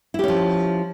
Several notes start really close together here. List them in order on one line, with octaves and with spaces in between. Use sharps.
E4 G4 C#4 F3